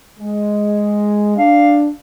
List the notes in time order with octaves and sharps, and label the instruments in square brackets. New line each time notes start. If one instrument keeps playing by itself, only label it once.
[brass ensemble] G#3
[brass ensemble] D4 [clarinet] F5